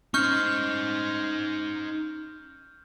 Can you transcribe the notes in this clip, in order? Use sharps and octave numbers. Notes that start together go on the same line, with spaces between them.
C#4 D#4 C5 C#6 F6 G6